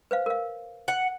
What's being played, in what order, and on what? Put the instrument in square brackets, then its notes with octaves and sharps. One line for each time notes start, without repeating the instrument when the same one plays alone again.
[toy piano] B4 C5 F5
A#4 F5
[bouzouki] F#5